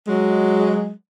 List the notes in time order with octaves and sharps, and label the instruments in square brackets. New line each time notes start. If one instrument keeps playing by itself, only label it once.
[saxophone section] F#3 G#3